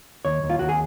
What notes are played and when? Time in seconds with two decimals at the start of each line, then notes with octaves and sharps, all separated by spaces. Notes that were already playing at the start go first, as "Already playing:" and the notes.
0.25 D#2 C#5
0.43 D#2
0.50 F4
0.59 D#2 F#4
0.69 G#4